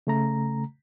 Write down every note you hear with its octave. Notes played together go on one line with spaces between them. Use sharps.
C#3 A3 A#5